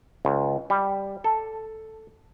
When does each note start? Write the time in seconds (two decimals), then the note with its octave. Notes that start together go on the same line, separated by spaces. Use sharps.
0.25 C#2
0.70 G3
1.24 A4